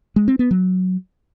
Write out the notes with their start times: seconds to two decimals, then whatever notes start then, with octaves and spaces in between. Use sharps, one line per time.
0.16 G#3
0.28 C4
0.39 B3
0.51 F#3